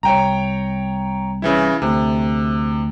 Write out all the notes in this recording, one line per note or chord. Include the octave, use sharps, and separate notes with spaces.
C2 C#5 G5 A#5
C#3 E3 E4
D2 C3